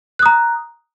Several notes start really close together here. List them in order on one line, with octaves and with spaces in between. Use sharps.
F#6 D#6 A#5